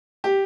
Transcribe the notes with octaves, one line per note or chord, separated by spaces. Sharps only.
G4